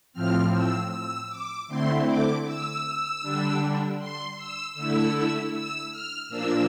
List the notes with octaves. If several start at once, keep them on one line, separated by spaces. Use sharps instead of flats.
A2 F3 C4 F6
E6
E6
D6
D3 A3 C4 E4 C6
D6
E6
D3 G3 D4
C6
E6
D3 A3 E4 E6
E6
F6
A#2 F3 A#3 D4 E6